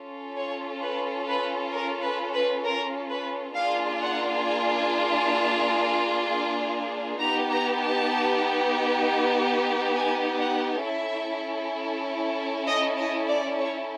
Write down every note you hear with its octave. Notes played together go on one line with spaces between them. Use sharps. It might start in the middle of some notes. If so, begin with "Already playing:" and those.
Already playing: C#4 F4 A4
C#5
B4
B4
A#4
B4
B4
A#4
B4
A#3 D4 F4 G#4 F5
F#5
G#5
G#5
A5
B3 D#4 G4 A#5
A#5
A5
G#5
F#5
C#4 E4 A4 E5
D#5
D#5
D5
C#5